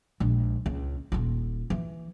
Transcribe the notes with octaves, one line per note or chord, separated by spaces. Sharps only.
A#1 G#3
C#2
D#1 F4
E3